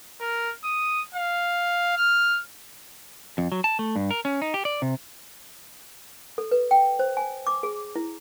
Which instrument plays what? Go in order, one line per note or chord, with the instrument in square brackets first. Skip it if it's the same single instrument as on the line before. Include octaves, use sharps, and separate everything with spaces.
[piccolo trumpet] A#4
D#6
F5
F6
[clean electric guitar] F2
F#3
A5
A3
G2
A#4
C#4
D#4
G4
D5
C3
[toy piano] A4
B4
G5
C5
G#5
D6
G#4
E4